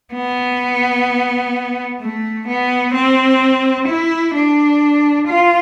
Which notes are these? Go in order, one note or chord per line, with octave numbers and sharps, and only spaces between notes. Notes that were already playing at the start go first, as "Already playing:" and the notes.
B3
A3
B3
C4
E4
D4
F4